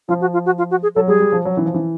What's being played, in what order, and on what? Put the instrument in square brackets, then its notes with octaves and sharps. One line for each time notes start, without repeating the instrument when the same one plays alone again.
[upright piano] F3 [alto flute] F4
[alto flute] F#4
F4
F#4
F4
F#4
G#4
[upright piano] F#3 [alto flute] A4
[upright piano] G3 [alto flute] G#4
[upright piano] G3
F3
F#3
E3
F3
E3